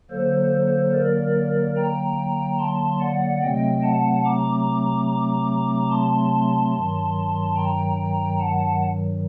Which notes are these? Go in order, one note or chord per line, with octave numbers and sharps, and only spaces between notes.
D3 F#3 A#3 A4 C5
A#4 D5
G5 A#5
A5 C6
D5 F#5
C3 F#3 A3 C4 D#5 G5
F#5 A5
A#5 D6
A#5 D6
A5 C6
G2 D#3 F#3
G5 A#5
G5 A#5
F#5 A5